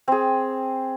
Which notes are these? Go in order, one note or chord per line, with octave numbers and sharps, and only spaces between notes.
C4 G#4